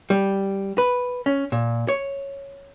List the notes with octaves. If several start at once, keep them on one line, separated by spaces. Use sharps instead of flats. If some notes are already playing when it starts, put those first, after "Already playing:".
G3
B4
C#4
A#2
C#5